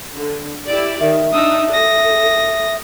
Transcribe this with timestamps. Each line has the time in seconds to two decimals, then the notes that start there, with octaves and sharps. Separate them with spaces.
0.16 D3
0.65 E4 G4 D5
1.00 D#3 E5
1.33 D4 D#4 D#6 E6
1.73 A4 D#6 A#6